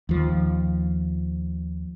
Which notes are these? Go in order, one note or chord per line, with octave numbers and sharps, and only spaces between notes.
D#2 F3